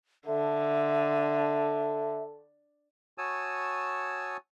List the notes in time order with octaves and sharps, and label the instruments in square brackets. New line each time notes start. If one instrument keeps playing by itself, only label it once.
[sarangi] D3 [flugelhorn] A4 [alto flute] E5
[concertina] F#4 C#5 G#5 A5 D#6 E6